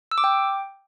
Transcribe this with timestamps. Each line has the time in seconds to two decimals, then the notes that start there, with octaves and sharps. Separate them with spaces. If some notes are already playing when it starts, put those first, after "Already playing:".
0.11 E6
0.18 D6
0.24 G5